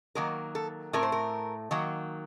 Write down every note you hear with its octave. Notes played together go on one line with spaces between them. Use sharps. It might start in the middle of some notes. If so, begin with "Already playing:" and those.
D#3 F#3 A#3 A#4
A4
A2 A3 C4 A#4
C5
A#4
D#3 F#3 A#3